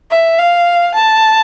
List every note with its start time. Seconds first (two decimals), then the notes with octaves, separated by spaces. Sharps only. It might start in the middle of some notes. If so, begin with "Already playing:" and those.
0.11 E5
0.39 F5
0.94 A5